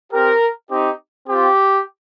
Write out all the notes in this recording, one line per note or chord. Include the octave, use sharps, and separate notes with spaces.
C4 G4 A#4
C4 D#4 G4
C4 F4 G4